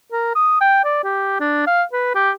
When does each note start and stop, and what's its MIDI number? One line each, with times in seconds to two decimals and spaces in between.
0.12 0.33 70
0.35 0.57 87
0.61 0.80 79
0.84 1.00 74
1.04 1.38 67
1.40 1.64 62
1.67 1.83 77
1.93 2.12 71
2.15 2.31 67